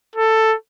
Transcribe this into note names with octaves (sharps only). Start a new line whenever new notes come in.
A4